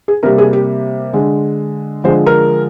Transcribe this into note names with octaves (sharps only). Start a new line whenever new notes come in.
G#4
C3 G3 A#3 A#4
G#4
G4
D3 G#3
D3 F3 G#3 C5
A#4